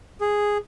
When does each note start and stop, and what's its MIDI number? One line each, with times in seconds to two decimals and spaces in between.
0.21 0.58 68